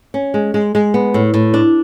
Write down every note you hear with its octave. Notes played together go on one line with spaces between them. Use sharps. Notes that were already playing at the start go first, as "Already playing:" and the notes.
C#4
G#3
G#3
G#3
B3
A2
A2
D4